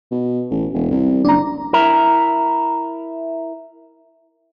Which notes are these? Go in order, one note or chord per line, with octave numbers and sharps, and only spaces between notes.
B2
A1
E1
C2
F#1 D4 A#5
E4 A#4